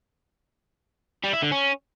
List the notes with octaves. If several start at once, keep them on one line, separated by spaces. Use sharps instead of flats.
G3
E4
D3
C#4